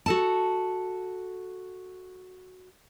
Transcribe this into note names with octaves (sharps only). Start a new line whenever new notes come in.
F#4 A4 A5